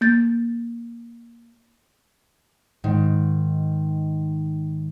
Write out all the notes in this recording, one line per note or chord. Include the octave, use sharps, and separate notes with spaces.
A#3 G6 A6
G#2 D#3